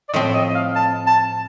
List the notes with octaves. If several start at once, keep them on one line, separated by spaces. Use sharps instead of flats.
D5
A2 F3 C4 D#5
D#5
D#5
F5
A5
A5